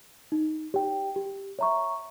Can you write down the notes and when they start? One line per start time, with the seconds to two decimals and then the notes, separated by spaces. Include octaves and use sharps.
0.32 D#4
0.74 G4 C#5 G5
1.16 G4
1.59 C#5 E5 A#5 C#6